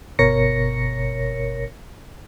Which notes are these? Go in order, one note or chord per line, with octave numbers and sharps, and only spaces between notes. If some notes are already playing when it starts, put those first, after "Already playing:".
G1 B2 A#4 C#5 A#6 C#7